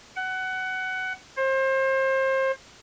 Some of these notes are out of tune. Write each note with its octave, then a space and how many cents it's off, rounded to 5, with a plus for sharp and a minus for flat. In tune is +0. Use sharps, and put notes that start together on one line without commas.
F#5 +20
C5 +30